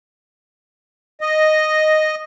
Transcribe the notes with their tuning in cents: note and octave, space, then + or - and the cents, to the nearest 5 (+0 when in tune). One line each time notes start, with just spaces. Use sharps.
D#5 -5